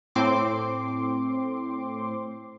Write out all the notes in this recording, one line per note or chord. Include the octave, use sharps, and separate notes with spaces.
A2 C4 C6 D6